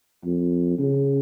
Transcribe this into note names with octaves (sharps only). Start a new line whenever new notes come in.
F2
C#3